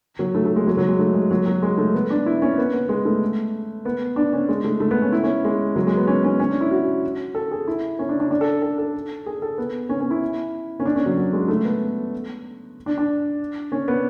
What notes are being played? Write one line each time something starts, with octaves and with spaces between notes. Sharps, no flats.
F#3
A3
A3
G#3
F#3
F#3
G#3
A3
G#3
F#3
F#3
G#3
A3
B3
D4
E4
C#4
B3
B3
G#3
A3
B3
D4
C#4
G#3
A3
A3
B3
C#4
E4
C#4
G#3
F#3
G#3
B3
C#4
C#4
C#4
D4
E4
F#4
A4
G#4
E4
C#4
D4
D4
D4
A4
A4
A4
G#4
A4
B3
C#4
C#4
E4
C#4
D4
C#4
F#3
F#3
G#3
A3
B3
D4
D4
C#4
B3